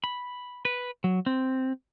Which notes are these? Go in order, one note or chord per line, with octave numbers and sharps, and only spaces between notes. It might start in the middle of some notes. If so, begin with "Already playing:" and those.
B5
B4
F#3
C4